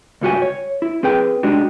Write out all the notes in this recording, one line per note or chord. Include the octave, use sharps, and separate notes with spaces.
C#2 G2 G3 F#4 G4 G#5
C#5
E4
C4 G#4 B4 G5
G#3 D4 D#4 F#4 G4